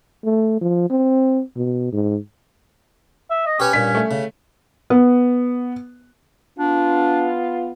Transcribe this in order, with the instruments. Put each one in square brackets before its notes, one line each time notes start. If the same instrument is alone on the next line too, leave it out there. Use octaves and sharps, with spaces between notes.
[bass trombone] A3
F3
C4
B2
G#2
[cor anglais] E5
D#5
[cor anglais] C#4 [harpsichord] G4 B4 G#5
[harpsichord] G2 A#2 [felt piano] B6
[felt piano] A3
[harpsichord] C#3
[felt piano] B3
[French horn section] B3 F4 [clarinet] D4